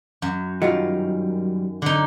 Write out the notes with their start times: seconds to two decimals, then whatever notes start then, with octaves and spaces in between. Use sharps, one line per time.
0.22 F#2
0.62 D#3 F#3 G3 F4
1.82 D3 D#4